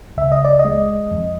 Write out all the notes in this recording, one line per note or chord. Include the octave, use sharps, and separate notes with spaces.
C#2 E5
D#5
D5
D#5
G#3
F2